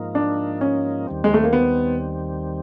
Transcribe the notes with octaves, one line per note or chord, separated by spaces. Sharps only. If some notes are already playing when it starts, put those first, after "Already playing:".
Already playing: G#2 F3 A#3 D#4
D4
C#4
D#2 D#3 G3 C4
G#3
A3
A#3
B3